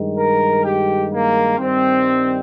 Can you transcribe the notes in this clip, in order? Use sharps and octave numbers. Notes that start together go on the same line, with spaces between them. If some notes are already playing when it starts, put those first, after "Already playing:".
Already playing: G2 D#3 G#3
A#4
G4
A#3
G2 D#3 G3 C4